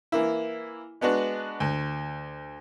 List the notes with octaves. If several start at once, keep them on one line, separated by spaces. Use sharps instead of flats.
E3 A#3 E4
G#3 B3 D4 F#4
D2